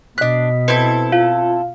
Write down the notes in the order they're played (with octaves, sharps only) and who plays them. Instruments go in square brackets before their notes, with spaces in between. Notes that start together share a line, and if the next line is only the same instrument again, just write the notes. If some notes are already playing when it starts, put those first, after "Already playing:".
[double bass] B2 [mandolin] D4 F#6 [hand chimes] D#5 B6
[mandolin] C4 E4 A4 [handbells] B4
[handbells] F4 [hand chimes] F5